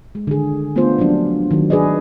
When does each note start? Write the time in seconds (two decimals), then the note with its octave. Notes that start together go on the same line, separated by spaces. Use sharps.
0.15 G#3
0.27 D3 D#3 G#4
0.75 E3 A3 B3 D4 F4 C5
0.98 F3 F#3 A#3 D4
1.51 D#3 F#3
1.70 D4 G#4 B4 D5 D#5